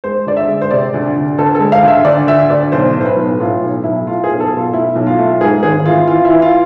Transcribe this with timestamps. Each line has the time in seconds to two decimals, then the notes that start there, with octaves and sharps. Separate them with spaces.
0.04 G#3 C5
0.26 D2 D5
0.37 E5
0.48 G#3
0.62 C5
0.71 C3 D5
0.94 D2
1.16 D2
1.38 D2 A4
1.55 G#3 A4
1.72 F5
1.82 D2
1.88 E5
2.05 D2 D5
2.27 D2 E5
2.50 D2 D5
2.72 B1 C5
2.95 A2
3.01 C5
3.06 B4
3.16 B1
3.40 A2 F4
3.62 B1
3.84 B1 E4
4.07 A3 F4
4.24 G#4
4.29 B1
4.40 A4
4.52 B2 F4
4.73 A3 E4
4.96 B1
5.07 F4
5.19 A3
5.41 G#2 G#4
5.63 G#1 G#4
5.86 E3 F4
6.08 E3 F4
6.25 E4
6.30 E3
6.42 F4